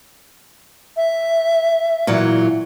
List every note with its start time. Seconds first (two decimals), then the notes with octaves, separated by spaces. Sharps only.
0.97 E5
2.07 A#2 E3 F#3